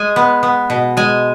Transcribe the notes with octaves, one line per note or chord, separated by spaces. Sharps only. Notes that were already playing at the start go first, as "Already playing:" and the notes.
Already playing: G#3 G#5
B3
B3
B2
G#3 G#5